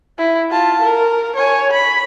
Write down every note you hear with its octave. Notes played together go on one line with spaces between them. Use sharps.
E4
F4 A5
A#4
C#5 G#5
B5